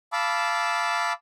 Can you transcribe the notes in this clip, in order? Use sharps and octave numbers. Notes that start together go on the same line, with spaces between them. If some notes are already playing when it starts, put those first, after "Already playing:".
F5 A5 B5 D6 E6